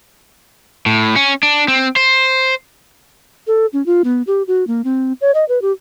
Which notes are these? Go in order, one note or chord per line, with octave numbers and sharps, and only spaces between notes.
A2
C#4
D4
C4
C5
A4
C#4
F4
B3
G4
F#4
A#3
C4
C#5
D#5
B4
G4